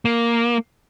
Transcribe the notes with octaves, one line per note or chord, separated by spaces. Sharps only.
A#3